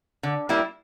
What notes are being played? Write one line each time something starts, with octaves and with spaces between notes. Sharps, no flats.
D3
G3 A#3 E4